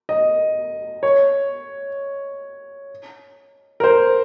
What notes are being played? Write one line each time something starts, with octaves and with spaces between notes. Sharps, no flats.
D#5
C#5
A#4
C5